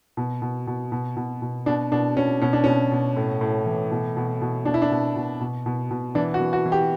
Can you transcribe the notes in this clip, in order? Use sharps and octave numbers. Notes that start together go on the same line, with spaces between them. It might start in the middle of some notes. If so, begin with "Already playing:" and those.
B2
B2
B2
B2
B2
B2
B2 D4
B2 D4
B2 C#4
B2 C#4
D4
B2 C#4
B2
A2
A2
E3
B2
B2
B2
B2 D4
E4
D4
B2
B2
B2
B2
B2
E3 D4
F#4
E3
F#4
E3
G4